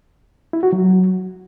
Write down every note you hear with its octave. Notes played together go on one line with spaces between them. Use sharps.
E4
F#4
F#3